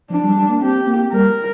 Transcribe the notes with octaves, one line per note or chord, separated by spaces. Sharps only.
F3 D4
G3
G3
A#3
C4 G4
A#3
G3 A#4